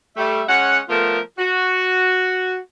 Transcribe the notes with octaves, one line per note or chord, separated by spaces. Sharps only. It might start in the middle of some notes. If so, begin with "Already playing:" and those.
G3 A3 E5
G#3 C#4 C#5 F#5
F3 A3 B3 F4 A4 A#4
F#4